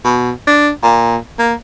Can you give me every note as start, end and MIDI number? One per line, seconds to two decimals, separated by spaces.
0.04 0.31 47
0.47 0.70 62
0.83 1.17 46
1.39 1.54 58